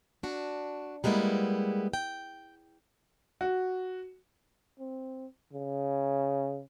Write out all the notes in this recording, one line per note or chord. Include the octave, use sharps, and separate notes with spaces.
D4 F#4
G3 G#3 A#3 B3 E4
G5
F#4
C4
C#3